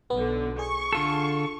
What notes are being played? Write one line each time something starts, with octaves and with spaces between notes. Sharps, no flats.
B1 D3 B3
G#4 C#6
D3 F4 A4